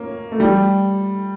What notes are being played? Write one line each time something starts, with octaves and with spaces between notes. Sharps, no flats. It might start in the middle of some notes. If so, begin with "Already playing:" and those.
Already playing: A#3 C#4
A3
G3